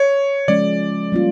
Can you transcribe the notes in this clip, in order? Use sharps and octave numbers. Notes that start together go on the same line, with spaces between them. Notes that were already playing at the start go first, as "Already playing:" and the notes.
Already playing: C#5
F3 G#3 C#4 D5
G3 A#3 C#4 F4